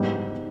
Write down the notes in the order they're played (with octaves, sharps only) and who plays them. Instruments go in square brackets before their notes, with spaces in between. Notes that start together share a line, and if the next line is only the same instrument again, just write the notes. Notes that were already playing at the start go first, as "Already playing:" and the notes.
Already playing: [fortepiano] G#2 G3 B3